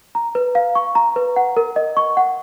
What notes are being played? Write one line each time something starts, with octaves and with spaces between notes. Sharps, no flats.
A#5
B4
F5
C#6
A#5
B4
F#5
A#4
D#5
C#6
F#5